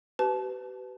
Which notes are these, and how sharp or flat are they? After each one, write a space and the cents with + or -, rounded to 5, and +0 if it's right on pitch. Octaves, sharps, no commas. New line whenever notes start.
G4 -45 B4 +20 A5 -25